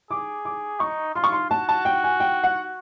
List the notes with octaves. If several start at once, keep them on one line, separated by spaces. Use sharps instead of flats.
G#4 D6
D6
D#4 C#6
F4 C6
C#6
C6
F#4 A5
A5
G5
G#5
G5
F#5